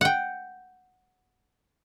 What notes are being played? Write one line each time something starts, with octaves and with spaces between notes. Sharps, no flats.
F#5 G5